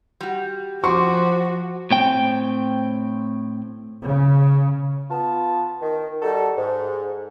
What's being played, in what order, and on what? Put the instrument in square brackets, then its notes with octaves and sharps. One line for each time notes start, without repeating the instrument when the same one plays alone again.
[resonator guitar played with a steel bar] G3 F#4
[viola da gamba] F3 [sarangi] F#4 [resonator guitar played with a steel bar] C5 [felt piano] C#6 D6
[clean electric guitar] A2 C4 G5
[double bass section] C#3
[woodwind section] B3 F4 A5
D#3
G3 D#4 F#4 A4
G#2